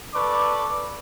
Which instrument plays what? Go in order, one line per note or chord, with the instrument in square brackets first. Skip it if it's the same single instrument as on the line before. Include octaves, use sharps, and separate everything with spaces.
[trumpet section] A4 B4 D5 C#6 D6